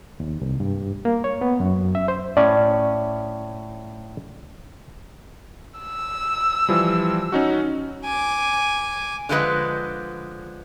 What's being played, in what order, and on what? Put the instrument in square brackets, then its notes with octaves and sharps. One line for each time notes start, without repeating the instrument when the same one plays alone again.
[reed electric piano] D#2
C2
G2
A#3
C#5
B3
F#2
E5
C5
[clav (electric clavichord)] A2 C#4 G#5 [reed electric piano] D5
[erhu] E6
[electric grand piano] E3 F3 G3
C#4 D#4 F#4
[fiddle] G#5 D6
[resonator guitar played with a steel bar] D3 F3 G#3 B4 D#5